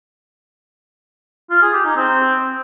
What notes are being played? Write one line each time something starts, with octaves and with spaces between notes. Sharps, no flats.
F4
G#4
G4
D#4
C4